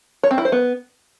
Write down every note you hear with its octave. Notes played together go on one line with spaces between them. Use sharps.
C#5
C4
E4
C5
B3